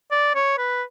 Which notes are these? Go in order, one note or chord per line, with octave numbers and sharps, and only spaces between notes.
D5
C#5
B4